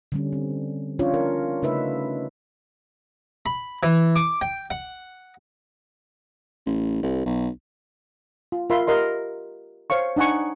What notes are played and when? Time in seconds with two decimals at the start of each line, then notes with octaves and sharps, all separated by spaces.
0.12 D3 G3 C#4
0.33 C4
0.99 C#4 D4 F4 C#5
1.14 A#4
1.62 C#3 A3 D4 D#4 B4 E5
3.46 B5
3.83 E3
4.16 D6
4.41 G5
4.71 F#5
6.66 A1
7.03 C2
7.25 B1
8.52 F4
8.70 F4 A#4 E5 B5 C6
8.87 G4 A#4 D#5 C6
9.90 C5 C#5 F5 C#6
10.16 D4 D#4 F#5 G#5 C#6